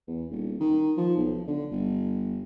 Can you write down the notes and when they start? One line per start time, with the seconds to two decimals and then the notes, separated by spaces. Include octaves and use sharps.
0.07 E2
0.31 D#1
0.60 D#3
0.97 F3
1.17 B1
1.47 D3
1.71 G1